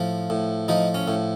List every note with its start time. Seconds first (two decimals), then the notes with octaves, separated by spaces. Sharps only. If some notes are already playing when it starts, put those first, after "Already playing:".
Already playing: A2 F3
0.30 A2
0.68 F3 D#4
0.94 C#4
1.08 A2